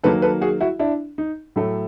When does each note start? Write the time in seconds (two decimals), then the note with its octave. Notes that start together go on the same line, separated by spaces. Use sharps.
0.03 D#3 F#3 A#3 A4 B4
0.22 A4 B4
0.41 F#4 G#4
0.61 E4 F#4
0.79 D4 E4
1.18 D#4
1.56 A2 F#3 A3